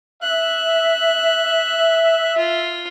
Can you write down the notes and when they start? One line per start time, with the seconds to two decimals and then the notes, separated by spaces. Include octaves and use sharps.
0.23 E5 F#6
2.37 F4